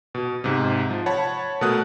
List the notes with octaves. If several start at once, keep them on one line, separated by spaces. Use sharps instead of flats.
B2
G#2 C3
F3
C#5 F#5 A5 B5
B2 A3 A#4 F#5 D#6 F#6